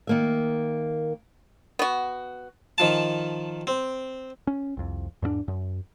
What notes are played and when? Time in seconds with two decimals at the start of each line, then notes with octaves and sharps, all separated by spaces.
0.07 D#3 A#3 E5
1.79 B3 F#4
2.78 D#3 F3 A5
3.67 C4
4.47 C#4
4.77 C2 F2
5.22 E2 G#2 A3 D4
5.48 F#2